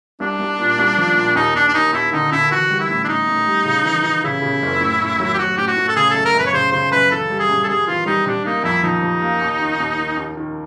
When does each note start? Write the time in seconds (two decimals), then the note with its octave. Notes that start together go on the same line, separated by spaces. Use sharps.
0.20 C2 D4
0.39 C2
0.59 A#2
0.79 C2
0.98 F3
1.16 A#2
1.35 D#2 D#4
1.55 D#2 D4
1.68 D4
1.74 D#2 D#4
1.93 D#2 E4
2.12 D3 D#4
2.32 D3 E4
2.50 E3 F#4
2.70 G3
2.80 E4
2.90 A2
3.04 D4
3.08 A2 D#4
3.28 A2
3.46 G3
3.65 C#3
3.85 E3
4.04 E3
4.24 C#3 E4
4.42 C#3
4.62 F#1
4.81 A2
5.00 A2
5.20 F#3
5.34 G4
5.38 F#3 F#4
5.57 A2 G4
5.67 F#4
5.77 A2
5.88 A4
5.96 C#3 G#4
6.11 F#2 A4
6.25 A#4
6.35 F#2 B4
6.46 C#5
6.53 C#3 C5
6.72 C#3 C5
6.92 F#2 B4
7.11 E3 A4
7.30 G3
7.39 G#4
7.50 G2
7.64 A4
7.69 G3 G#4
7.87 E3 F4
8.06 G3 D#4
8.26 C3 D4
8.45 A#3 D#4
8.64 F2 E4
8.83 F3 D#4
9.02 F3
9.22 A#3
9.41 D#2
9.59 D#3
9.80 D#2
9.99 D#3
10.17 D#2
10.37 D#3